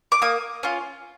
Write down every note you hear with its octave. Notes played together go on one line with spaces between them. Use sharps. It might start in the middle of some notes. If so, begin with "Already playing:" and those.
D6
A#3 D#6
C#4 F4